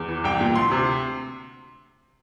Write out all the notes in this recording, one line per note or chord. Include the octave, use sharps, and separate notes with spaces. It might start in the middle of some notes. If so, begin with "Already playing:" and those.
Already playing: E2
E3
C2 G5
A#2
D2 C6
C3